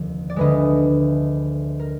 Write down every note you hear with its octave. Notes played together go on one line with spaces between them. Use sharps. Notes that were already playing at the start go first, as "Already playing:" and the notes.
Already playing: F1 D#2 D3 F3
D5
D2 D3 G#3 B4 D#5
A#4